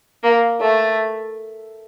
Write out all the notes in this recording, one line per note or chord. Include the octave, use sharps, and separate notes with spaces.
A#3
A3